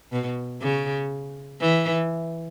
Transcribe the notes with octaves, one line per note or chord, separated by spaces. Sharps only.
B2
C#3
E3